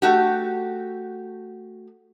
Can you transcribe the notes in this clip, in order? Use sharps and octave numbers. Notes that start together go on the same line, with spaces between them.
A3 F#4 G4